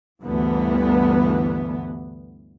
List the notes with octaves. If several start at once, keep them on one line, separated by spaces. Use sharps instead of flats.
G1 D2 G2 E3 B3